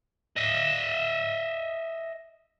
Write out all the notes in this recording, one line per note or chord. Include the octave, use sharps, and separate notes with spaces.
D#5 E5